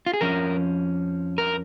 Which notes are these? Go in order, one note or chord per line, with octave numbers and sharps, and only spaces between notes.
F4
G#4
F2 F3 C#4 A#4
A#4